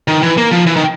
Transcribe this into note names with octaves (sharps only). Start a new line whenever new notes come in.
D#3
E3
A#3
F3
E3
D#3